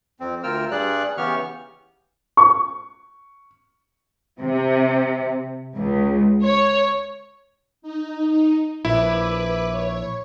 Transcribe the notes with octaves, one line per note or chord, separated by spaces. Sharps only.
F2 C4
D2 F4 A#4 G5 E6 F6
G2 G3 G#4 D5 F#6
C#3 E3 B3 G4 C#6 F6
C#6
C3
C#2
C#5
D#4
A#1 E4 B4 D6
C#5